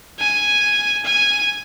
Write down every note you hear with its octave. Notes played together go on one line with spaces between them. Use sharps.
G#5
G#5